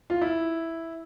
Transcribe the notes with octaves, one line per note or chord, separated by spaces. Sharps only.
F4
E4